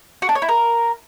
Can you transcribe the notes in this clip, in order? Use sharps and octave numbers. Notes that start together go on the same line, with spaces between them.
F#4
D4
C#5
E4
A#4